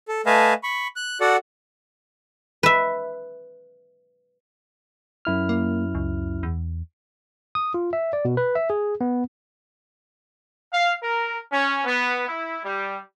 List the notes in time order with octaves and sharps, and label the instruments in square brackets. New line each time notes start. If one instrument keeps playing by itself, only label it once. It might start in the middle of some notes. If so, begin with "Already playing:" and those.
[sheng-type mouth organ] A4
A3 B4 D#5 F5 G#5 A5
B5 C#6
F#6
F#4 A4 D5 F#5
[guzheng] B4 E5
[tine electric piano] F#2 E4 F6
[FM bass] A#3
C#2
E2
[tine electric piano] D#6
F4
E5
D5
B2
B4
E5
G#4
B3
[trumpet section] F5
A#4
C#4
B3
E4
G3